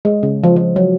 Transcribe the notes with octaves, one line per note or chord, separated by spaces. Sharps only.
G#3
C#3
F3
F3
F#3